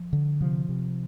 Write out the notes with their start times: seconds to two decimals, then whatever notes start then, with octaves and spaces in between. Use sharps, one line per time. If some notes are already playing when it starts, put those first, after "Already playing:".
Already playing: F3
0.13 D3
0.41 C3 F3
0.69 C3